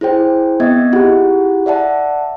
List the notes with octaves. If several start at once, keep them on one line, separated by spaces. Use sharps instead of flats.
E4 G#4 C5 G5
B3 C4 D#5 E5 G#6
E4 F4 G4 G#4 F#5
D5 E5 F#5 A5